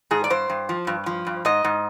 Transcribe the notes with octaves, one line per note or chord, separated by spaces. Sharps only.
G#2 G#4
D5
G2 C5
G2
F3
G2
F3
G2
G#2 D#5
G#2